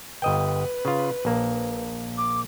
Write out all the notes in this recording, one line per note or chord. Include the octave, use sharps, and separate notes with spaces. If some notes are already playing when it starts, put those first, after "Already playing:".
G1 B4 D#5 G5
C#3 F4
A#1 A#3
D6